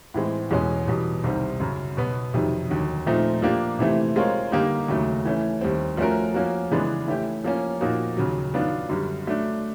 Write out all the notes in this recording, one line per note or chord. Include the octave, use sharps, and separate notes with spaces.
A2 E3 G#3 C4
E2 B2 G#3 C#4 F#4
E2 B2 G3
C2 C3 D#3 G3 C4
F#2 C#3 F#3
B2 F#3 B3
F2 C3 D#3 F#3
D#2 D3 F#3
A#2 F3 A3 C4 D#4
F3 A#3 D4 G4
C3 E3 A3 C4 E4
G#3 C4 F4 A#4 C#5
D3 G3 A#3 D#4 G4
D#2 C#3 F#3 A3
E3 A3 C#4
D#2 D#3 G3 C4
F3 A3 C#4 F#4 A#4
F3 A#3 C#4 F#4
C#3 E3 G#3 B3 D4
E3 A3 C#4 E4 G4
F3 A#3 C#4
A#2 F3 A#3 D#4 F#4
D#2 C#3 F#3
D#3 F#3 B3 D4 F4
F#2 D3 G3
F#3 A3 D4